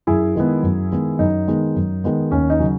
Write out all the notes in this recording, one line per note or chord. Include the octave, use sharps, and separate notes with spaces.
F#2 E4 G#4
D#3 G#3 B3
F#2
D#3 G#3 B3
F#2 D#4
D#3 G#3 B3
F#2
D#3 G#3 B3
D#2 C#4
D#4
C#3 F#3 C#4